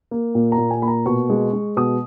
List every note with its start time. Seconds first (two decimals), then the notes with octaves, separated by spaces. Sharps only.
0.11 A#3
0.35 A#2
0.52 A#5
0.58 A#2
0.71 G#5
0.82 A#3 B5
0.88 A#5
1.06 B2 C#6
1.30 G#3
1.53 G#3
1.77 B2 D#6